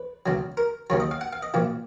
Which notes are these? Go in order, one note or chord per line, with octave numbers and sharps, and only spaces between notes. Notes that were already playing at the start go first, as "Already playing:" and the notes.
Already playing: B4
C#2 B2 F#3
A#4
D#2 C#3 F#3 C#5
D#5
F5
F#5
F5
D#5
B1 A#2 F3